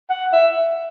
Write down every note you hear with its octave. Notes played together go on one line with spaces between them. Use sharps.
F#5
E5